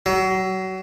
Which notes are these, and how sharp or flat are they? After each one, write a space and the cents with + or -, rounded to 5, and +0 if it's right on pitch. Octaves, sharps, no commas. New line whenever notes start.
F#3 +30